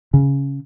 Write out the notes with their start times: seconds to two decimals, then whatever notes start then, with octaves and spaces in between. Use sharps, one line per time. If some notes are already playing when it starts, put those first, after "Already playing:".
0.14 C#3